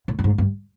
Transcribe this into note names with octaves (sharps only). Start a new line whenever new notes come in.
A2
G2
G#2
G2